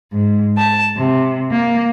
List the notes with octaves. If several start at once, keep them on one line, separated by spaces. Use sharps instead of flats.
G#2
A5
C3
A#3